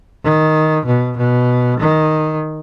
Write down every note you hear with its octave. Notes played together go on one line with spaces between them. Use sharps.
D#3
B2
B2
D#3